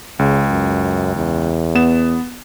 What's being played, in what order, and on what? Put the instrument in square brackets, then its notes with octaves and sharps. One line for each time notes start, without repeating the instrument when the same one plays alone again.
[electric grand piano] C#2 [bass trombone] C#3
[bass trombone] F#2
E2
[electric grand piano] B3 E7